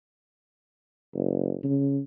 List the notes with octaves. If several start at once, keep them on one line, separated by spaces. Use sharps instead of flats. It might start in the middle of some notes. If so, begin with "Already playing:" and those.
F#1
C#3